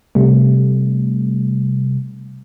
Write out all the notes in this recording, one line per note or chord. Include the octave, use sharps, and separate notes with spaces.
C3 G3 A3